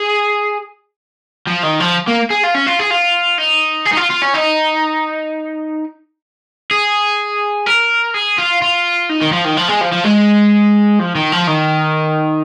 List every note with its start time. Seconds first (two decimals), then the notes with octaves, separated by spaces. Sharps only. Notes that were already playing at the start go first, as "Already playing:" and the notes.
Already playing: G#4
1.47 F3
1.63 D#3
1.80 F3
2.08 A#3
2.31 G#4
2.44 F4
2.55 C#4
2.67 F4
2.80 G#4
2.91 F4
3.38 D#4
3.86 G#4
3.93 D#4
3.97 F4
4.10 F4
4.22 C#4
4.34 D#4
6.71 G#4
7.67 A#4
8.14 G#4
8.38 F4
8.62 F4
9.09 D#4
9.22 D#3
9.33 F3
9.45 D#3
9.57 F3
9.69 G#3
9.81 F3
9.92 F3
10.05 G#3
10.99 F3
11.15 D#3
11.32 F3
11.48 D#3